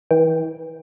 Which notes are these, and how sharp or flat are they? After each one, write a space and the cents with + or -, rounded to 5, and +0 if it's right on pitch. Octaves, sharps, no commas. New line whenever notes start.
E3 -35 G5 +0